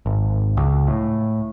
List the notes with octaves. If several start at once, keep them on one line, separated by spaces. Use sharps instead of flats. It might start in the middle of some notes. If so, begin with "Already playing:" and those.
G#1
C#2
A2